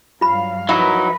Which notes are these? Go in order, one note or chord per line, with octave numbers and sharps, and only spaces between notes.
G2 F#3 F4 F5 B5
F3 F#3 D#4 E4 A#4 B4